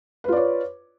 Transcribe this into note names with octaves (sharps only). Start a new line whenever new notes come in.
F4 B4 C#5 D5